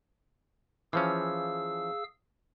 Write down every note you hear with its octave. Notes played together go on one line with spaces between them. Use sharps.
E3 F3 C#4 G#4 F5 E6